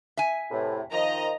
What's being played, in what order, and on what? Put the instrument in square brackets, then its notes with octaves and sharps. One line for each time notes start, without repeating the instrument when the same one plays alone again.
[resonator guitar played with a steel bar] E5 G#5
[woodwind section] E2 A2 C3
[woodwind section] D#3 F3 [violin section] D#5 A#5